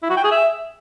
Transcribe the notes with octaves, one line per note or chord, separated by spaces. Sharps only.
E4
F#4
G5
G#4
E5